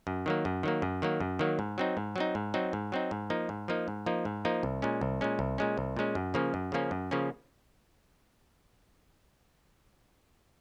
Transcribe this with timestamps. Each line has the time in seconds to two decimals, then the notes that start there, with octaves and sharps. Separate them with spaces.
0.07 F#2
0.26 D#3 F#3 A#3
0.45 F#2
0.63 D#3 F#3 A#3
0.82 F#2
1.02 D#3 F#3 A#3
1.20 F#2
1.39 D#3 F#3 A#3
1.59 G#2
1.78 F#3 C4 D#4
1.97 G#2
2.16 F#3 C4 D#4
2.35 G#2
2.54 F#3 C4 D#4
2.73 G#2
2.92 F#3 C4 D#4
3.11 G#2
3.30 F3 A#3 D#4
3.49 G#2
3.68 F3 A#3 D#4
3.88 G#2
4.06 F3 A#3 D#4
4.25 G#2
4.45 F3 A#3 D#4
4.63 C2
4.82 A#2 G#3 C#4
5.01 C2
5.21 A#2 G#3 C#4
5.39 C2
5.58 A#2 G#3 C#4
5.77 C2
5.96 A#2 G#3 C#4
6.15 F#2
6.34 C#3 F3 A#3 C#4
6.54 F#2
6.72 C#3 F3 A#3 C#4
6.91 F#2
7.11 C#3 F3 A#3 C#4